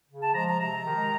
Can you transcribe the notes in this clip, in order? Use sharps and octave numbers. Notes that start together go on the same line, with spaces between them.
C#3
A5
F3 G#3 A#5
A#5
C3 A#5
D#3 G#3